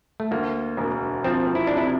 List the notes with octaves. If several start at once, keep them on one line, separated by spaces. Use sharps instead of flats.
A3
D2 A#3
E1
F3 C4
E4
C3 D4
E4